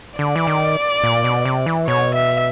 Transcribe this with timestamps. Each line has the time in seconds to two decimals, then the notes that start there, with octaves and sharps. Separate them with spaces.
0.19 D3 D5
0.36 E3
0.47 D#3
1.03 A#2
1.24 B2
1.45 C3
1.66 E3
1.87 B2 C#5
2.15 E5